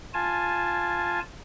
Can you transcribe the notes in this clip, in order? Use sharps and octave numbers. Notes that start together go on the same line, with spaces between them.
F4 G#5 A5